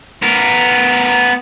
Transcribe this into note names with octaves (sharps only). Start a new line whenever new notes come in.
B3 A#4